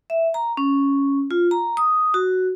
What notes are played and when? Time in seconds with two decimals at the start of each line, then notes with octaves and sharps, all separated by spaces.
0.10 E5
0.34 A#5
0.57 C#4
1.31 F4
1.51 A#5
1.77 D#6
2.14 F#4